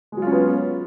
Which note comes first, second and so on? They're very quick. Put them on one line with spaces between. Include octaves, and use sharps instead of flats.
G#3 F#3 F4 C#4 B3